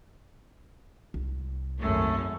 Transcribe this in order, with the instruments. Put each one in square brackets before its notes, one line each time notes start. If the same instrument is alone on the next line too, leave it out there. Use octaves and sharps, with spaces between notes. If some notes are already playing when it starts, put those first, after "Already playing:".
[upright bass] C2
[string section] G#1 F#2 C#4 [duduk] A3